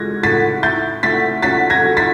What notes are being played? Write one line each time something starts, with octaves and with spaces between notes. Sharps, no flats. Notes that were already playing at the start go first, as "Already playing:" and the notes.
Already playing: G#3 G#6 A#6
A2 A6 B6
E4 G6 A6
A3 A6 B6
C#4 A6 B6
G#6 A#6
F#3
A6 B6